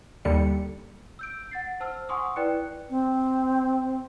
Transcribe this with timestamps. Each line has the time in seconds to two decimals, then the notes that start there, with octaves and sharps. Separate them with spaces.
0.25 D#2 D3 G3 C#7
1.19 E6 G6 D7
1.51 F#5 A6 C7
1.80 C5 A5 E6 F6
2.09 F#5 G#5 C6 C#6 D#6 E6
2.36 E4 B4 D5 G5 F#6 C#7
2.90 C4